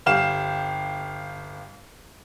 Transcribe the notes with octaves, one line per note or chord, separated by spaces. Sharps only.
G1 G4 F5 E7